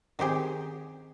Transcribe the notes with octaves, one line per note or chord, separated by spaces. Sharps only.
D#3 C4 G4 G#4